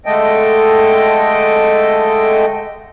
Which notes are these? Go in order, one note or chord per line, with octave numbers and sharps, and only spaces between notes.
D3 G#3 A3 A4 D#5 G5